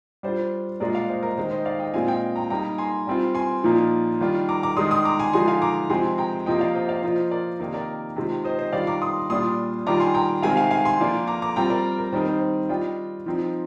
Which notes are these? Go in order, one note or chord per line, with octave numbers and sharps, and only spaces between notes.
G3 D4 F4 C5
A#2 G#3 D4 F4 A#4 D5
D5 F5
C5 D#5
A#4
D#3 G#3 D#4 C5
C5 D#5
D5 F5
D#5 G5
A#2 G#3 C4 F4 F5 G#5
D#5 G5
G5 A#5
G3 A#3 D#4 G5 A#5
G#5 C6
G3 C4 F4
G#5 C6
A#2 F3 A#3 D#4
D#3 G3 D4 F4
A#5 D6
A#5 D6
D#3 G#3 D4 C6 D#6
C6 D#6
A#5 D6
G#5 C6
D3 F3 G#3 D#4 G#5 C6
F5 G#5
A#5 D6
C3 F3 G#3 C4 G#5 C6
G5 A#5
C3 F3 A#3 D#5 G5
D5 F5
C5 D#5
D5 F5
F3 A#3 F4 C5 D#5
A#4 D5
C3 D#3 A#3 D#4
A#4 D5
C3 D#3 G#3 C4 F4
C5 D#5
C5 D#5
D#3 G3 D4 F4 D5 F5
A#5 D6
C6 D#6
A#2 G3 D4 F4 C6 D#6
D#3 G3 D4 F4 A#5 D6
G#5 C6
G5 A#5
C3 D#3 G#3 C4 F5 G#5
F5 G#5
F5 G#5
G#5 C6
F3 A#3 D4 F4
A#5 D6
A#5 D6
G3 C4 F4 G5 A#5
A#4 D5
A#4
D#3 G3 C4 D#4 C5
C5
C5
G3 D4 F4 D#5 G5
F3 C4 D#4